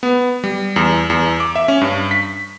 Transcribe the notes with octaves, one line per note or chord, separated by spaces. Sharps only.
B3
G3
E2
E2
D6
E5
C#4
G2
B6